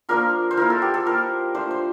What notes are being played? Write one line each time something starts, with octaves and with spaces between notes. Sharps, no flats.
F3 A#3 D4 F4 A#4
C5
F3 A#3 E4 A#4
A4
G4
A4
A#3 F4 A#4
F3 A3 D4 C5
C5